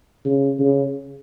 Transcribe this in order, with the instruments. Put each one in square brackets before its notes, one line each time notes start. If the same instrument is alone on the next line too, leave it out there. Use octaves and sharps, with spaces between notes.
[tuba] C#3
C#3